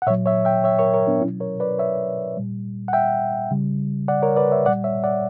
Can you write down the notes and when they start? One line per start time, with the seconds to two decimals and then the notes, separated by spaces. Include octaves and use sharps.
0.02 F#5
0.07 A#2 C#5 E5
0.10 F#3
0.26 C#5 E5
0.45 E5 G5
0.64 C#5 E5
0.79 A#4 C#5
0.94 A#4 C#5
1.07 B3 D4
1.21 B2 C#4 E4
1.25 F#3
1.40 A#4 C#5
1.60 B4 D5
1.79 C#5 E5
2.37 A#2 G3
2.88 F#5
2.93 E5 G5
3.51 C#3 G3
4.08 D5 F#5
4.22 A#4 C#5
4.36 B4 D5
4.51 C#5 E5
4.65 A#2 G3 D5 F#5
4.84 C#5 E5
5.04 D5 F#5